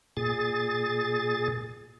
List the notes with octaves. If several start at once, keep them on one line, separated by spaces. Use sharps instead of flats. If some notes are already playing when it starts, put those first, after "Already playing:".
A#2 G#4 A6